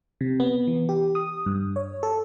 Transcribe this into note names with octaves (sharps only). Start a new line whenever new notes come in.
C3
B3
E3
G4
D#6
G2
C#5
A4